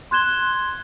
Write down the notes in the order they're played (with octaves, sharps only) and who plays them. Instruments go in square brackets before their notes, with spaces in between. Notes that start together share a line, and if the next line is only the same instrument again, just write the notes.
[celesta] C6 F#6 G#6 E7 G7